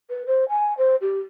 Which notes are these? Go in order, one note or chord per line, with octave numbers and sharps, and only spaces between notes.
B4
C5
G#5
C5
G4